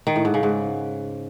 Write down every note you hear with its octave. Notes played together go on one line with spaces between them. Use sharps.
D#3
A2
G#2
C#3
G#2